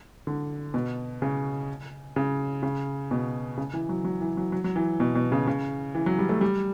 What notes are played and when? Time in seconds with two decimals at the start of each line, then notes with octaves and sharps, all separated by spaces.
0.27 D3
0.74 B2
1.22 C#3
2.16 C#3
2.63 C#3
3.11 B2
3.57 C#3
3.73 E3
3.89 F#3
4.05 F#3
4.21 E3
4.37 F#3
4.52 F#3
4.64 F#3
4.76 E3
5.00 B2
5.15 B2
5.32 C#3
5.47 C#3
5.95 E3
6.06 F#3
6.19 G3
6.29 A3
6.41 G3